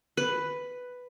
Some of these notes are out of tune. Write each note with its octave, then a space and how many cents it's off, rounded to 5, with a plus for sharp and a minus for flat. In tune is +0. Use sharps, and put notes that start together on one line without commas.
B4 +5